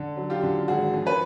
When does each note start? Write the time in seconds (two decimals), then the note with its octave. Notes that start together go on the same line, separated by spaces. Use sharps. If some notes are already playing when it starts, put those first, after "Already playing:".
Already playing: D3
0.17 F#3
0.30 F4 G4
0.43 D3
0.68 G#1 F#4 G#4
0.94 F3
1.06 B4 C#5